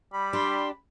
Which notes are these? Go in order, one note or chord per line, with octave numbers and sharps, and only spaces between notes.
G3 B5
D4 G4 C6